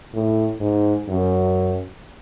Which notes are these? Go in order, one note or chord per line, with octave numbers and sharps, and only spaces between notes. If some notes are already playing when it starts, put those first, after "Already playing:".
A2
G#2
F#2